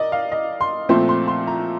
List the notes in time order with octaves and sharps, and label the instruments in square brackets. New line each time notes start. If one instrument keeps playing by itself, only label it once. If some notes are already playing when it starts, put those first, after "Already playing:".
Already playing: [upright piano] A#4 D5 D#5
F5
D#5
C6
A#2 F3 A3 C4 C6
C6
C6
A#5